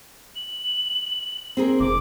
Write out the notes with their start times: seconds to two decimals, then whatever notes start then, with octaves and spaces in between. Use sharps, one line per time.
0.36 F#7
1.57 C4 G#4 A#4
1.80 F1 D6